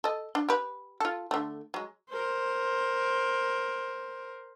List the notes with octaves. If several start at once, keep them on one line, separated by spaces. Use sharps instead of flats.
A4 D#5
D4
G4 B4
F4 A4
D3 A3
F#3 G#3
A#4 C5